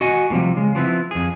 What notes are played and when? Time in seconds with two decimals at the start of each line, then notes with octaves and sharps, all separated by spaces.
0.01 F#4 D#5 F#5 G#5
0.30 A2 C3 F3 G3
0.56 C#3 G#3
0.75 F3 B3 C4 E4
1.11 F2 G#4